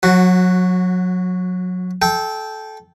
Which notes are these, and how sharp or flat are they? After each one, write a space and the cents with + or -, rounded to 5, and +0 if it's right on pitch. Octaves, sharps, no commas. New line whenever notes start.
F#3 -25 F#4 +0
A4 -20 G5 +0